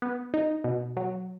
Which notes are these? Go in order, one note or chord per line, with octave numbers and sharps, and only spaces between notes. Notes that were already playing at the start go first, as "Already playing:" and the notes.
B3
D#4
B2
F#3